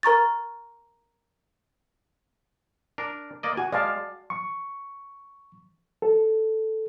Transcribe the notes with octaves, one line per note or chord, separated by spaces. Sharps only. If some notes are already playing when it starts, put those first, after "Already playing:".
A#4 A#5 C#6 A6
D4 A#4
A#3 D5 D#5
F#4 G#5
G#3 D5 F5 A5
C#6
A4